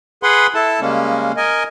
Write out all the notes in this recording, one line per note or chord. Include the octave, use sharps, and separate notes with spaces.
G#4 B4 F#5 B5 C6
E4 A4 A5
C#3 G3 G#3 A#3 C#4
A#4 D#5 G#5